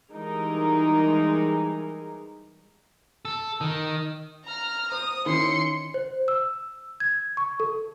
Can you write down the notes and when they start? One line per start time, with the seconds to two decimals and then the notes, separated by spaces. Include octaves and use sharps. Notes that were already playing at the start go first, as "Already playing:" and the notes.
0.11 E3 G3 G#3 D#4 G#4 A#4
3.25 A4
3.61 D#3
4.45 A#5 F6
4.92 C5 D#6
5.26 D#3 C#4 E4 C6 C#7
5.94 C5
6.28 E6
7.00 G#6
7.37 C#6
7.60 A4